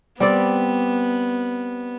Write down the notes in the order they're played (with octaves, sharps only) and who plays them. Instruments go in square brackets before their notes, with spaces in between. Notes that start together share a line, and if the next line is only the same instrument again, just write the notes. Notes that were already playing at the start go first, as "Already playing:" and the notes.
[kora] G3 C4 D5 [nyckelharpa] B3